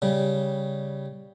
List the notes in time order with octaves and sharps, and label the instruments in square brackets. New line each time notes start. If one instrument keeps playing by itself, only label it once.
[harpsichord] C#3 G3